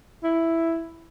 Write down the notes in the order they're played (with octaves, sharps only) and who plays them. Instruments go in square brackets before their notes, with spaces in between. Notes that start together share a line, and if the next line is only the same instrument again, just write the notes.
[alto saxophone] E4